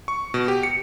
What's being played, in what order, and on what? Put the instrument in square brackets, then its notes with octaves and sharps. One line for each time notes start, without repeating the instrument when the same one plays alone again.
[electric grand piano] C#6
B2
G4
C#7